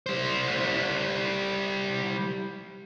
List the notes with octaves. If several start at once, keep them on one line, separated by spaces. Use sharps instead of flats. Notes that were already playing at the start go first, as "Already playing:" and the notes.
G3 C5